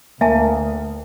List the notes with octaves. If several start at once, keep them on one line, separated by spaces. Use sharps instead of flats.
D2 A#3 E5 G#5 A5